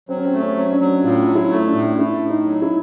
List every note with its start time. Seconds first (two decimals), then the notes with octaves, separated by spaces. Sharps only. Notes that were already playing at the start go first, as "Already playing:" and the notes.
0.09 F#3 C4
0.17 C#4
0.25 C4
0.33 A3
0.41 C#4
0.56 F#3
0.72 D4
0.80 F#3
1.04 A2 F4
1.27 F#3
1.35 E4
1.51 A3
1.67 D4
1.74 A2
1.99 A3 E4
2.23 A2
2.30 D#4
2.46 F#3
2.62 E4